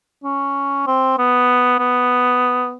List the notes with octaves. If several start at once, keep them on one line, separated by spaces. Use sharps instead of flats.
C#4
C4
B3
B3